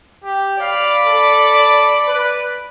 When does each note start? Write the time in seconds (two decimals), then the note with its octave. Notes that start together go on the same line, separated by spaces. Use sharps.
0.24 G4
0.61 D5 F5 B5
1.06 A4
2.08 B4